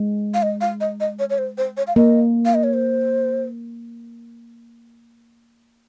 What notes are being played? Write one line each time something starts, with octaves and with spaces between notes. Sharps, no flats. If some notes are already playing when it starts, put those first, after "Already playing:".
Already playing: G#3
F5
D#5
F5
D#5
D#5
C#5
C#5
C5
C5
C#5
F5
A#3 D#5
F5
D#5
C#5
C5